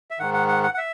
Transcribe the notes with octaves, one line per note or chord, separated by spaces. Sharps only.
E5
G#2 D#3 F#5
F#5
F#5
F#5
F#5
E5